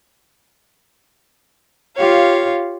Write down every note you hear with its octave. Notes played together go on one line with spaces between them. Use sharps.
F4 G4 C#5 F5